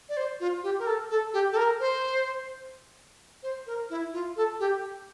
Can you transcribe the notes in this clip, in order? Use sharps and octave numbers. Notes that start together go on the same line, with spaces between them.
D5
C5
F4
G4
A#4
A4
A4
G4
A4
A#4
C5
C5
A#4
E4
F4
A4
G4